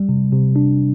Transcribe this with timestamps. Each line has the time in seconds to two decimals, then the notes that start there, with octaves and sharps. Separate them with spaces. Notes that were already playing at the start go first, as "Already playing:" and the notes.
Already playing: G3
0.09 C3
0.32 C3
0.56 D4